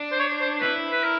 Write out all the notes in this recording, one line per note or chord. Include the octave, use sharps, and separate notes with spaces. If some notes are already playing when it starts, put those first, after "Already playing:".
Already playing: D4
C5
C#5
C5
E4 B4
B4
A#4